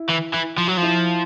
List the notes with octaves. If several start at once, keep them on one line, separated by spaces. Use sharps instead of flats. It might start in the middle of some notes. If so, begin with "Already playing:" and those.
Already playing: E4
E3
E3
F3
F#3
F3 E4